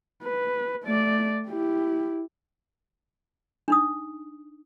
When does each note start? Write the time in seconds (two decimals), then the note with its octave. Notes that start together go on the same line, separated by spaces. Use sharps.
0.23 B4
0.84 A3 D5
1.48 E4 G4
3.68 D4 D#4 D#6